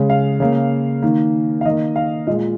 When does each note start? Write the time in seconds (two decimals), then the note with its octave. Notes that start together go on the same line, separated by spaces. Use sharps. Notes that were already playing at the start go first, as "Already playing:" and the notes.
Already playing: C#3 G#3
0.10 F5
0.40 C#3 A#3
1.02 D#3 A#3
1.61 F5
1.65 D#3 A#3 D#5
1.96 F5
2.27 A#2 G#3 D#5